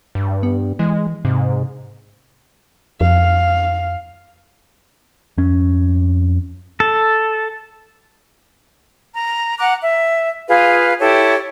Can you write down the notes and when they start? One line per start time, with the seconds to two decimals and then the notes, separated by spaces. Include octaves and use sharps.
0.15 G2
0.43 B3
0.79 E3 G#3
1.25 G#2 C3
3.01 F2 F5
5.38 F2 C#4
6.80 A4
9.13 A#5
9.59 F#5 A#5 D6 F#6
9.81 E5
10.47 F4 G#4 B4 F5
10.98 E4 G4 A4 C#5